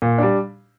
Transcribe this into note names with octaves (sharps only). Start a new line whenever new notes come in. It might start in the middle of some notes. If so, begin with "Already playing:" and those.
A#2
G3 D4